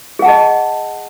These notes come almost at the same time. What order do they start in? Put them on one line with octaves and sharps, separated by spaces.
G#4 F#5 A5 D#5